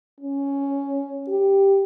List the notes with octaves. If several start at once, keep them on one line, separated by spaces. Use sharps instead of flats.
C#4
G4